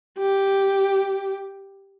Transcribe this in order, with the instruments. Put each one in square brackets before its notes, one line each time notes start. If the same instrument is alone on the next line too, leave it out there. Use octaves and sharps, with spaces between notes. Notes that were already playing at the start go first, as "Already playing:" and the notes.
[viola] G4